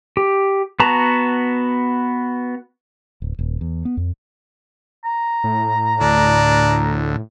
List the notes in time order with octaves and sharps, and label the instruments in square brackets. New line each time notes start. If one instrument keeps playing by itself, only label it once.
[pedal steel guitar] G4
B3 F#4 A5 A#5
[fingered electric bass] D1
D#1
E2
B3
F2
[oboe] A#5
[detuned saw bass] A2
[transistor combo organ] D2 [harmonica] D4